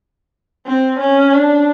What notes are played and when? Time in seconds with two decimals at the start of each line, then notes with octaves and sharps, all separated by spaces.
0.66 C4
1.00 C#4
1.33 D4